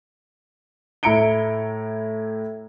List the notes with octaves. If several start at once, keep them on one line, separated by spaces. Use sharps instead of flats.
A2 E4 A#5 C#7 D7 G7